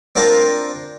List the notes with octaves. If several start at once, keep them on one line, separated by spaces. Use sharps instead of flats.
C4 D4 F4 A#4 C5